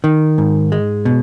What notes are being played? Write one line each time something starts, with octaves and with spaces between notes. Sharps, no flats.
D#3
G#2
G#3
B2